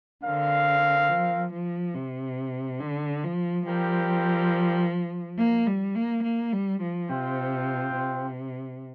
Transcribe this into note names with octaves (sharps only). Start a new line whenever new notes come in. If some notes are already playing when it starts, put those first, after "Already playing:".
D3 C4 A#4 F5
F3
F3
C3
D3
F3
F3 G3 C4 G4 A#4 G5
A#3
G3
A#3
A#3
G3
F3
C3 C4 F4 C5 G5
C3